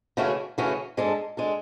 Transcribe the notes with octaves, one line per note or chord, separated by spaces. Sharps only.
C#3 E3 A3 C#4 F#4
C#3 E3 A3 C#4 F#4
G#2 G#3 D4 A4
G#3 D4 A4